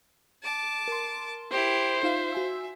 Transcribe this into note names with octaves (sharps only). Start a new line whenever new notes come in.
A5 D6
A#4 C6
E4 G4 C5
D#4 F4 E5 F5
F#4 G#5 E6